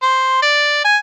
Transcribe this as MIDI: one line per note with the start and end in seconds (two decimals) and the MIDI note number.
0.02 0.41 72
0.42 0.81 74
0.85 0.97 80